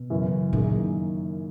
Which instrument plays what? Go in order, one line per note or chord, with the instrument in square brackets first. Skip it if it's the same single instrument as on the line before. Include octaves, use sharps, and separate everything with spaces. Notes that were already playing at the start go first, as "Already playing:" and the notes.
Already playing: [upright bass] B2
[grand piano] F#2 C#3 E3 B3
[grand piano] F#2 D#3 A#3 E4 G#4 [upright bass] A#2